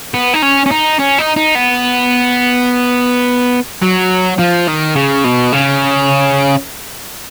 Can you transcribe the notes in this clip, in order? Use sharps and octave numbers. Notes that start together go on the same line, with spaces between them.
B3
D#4
C#4
C#4
D#4
C#4
D#4
D#4
B3
F#3
F3
D#3
C#3
B2
C#3